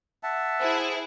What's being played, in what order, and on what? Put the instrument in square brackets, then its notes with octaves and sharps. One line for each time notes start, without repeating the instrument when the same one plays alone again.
[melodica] E5 F#5 A5
[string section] E4 G#4 [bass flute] C5